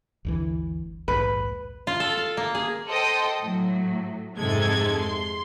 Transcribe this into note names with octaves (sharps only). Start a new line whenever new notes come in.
G1 D2 E3
A#1 D#2 G#2 B4
F4
A4
F5
A#3
G#4
A4 C5 D#5 G5 D#6
A2 F#3
F2 G#2 C3 G#3 A4 G#6
C6